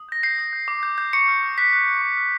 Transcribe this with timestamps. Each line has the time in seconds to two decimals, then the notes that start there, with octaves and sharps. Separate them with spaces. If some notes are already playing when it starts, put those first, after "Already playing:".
Already playing: D#6
0.09 G6 A#6
0.23 G6 C7
0.38 D#6
0.53 G6
0.68 D6
0.83 G6
0.98 G6
1.13 C#6 C#7
1.28 F6
1.42 F6
1.58 F#6 B6
1.73 F#6
1.88 F#6
2.02 C#6
2.17 F6